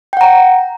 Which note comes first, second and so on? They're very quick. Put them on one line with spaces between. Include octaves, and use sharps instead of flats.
G5 F#5 A#5